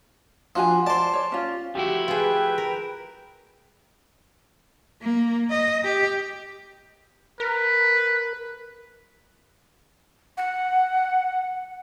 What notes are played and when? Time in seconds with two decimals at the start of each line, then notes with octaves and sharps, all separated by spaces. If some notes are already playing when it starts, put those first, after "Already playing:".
0.56 F3 D4 F#4 G#5
0.87 C5 D5 A5
1.13 C#5 D5
1.32 C#4 F4
1.75 F3 A3 E4 F#4 G4
2.08 F4 G#4 B4 G5
2.58 A#4
5.02 A#3
5.50 D#5
5.84 G4
7.40 A#4 B4
10.37 F#5